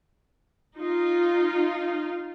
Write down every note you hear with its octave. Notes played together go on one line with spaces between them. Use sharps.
D#4 F4